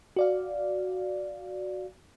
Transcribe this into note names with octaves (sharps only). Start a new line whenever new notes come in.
F#4 D5 F5